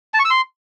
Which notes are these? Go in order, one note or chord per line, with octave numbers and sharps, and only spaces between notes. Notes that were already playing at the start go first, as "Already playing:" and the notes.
A5
C#6
E6
C6